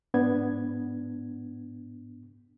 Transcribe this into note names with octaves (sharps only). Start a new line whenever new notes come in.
G#2 B3 D4 G#6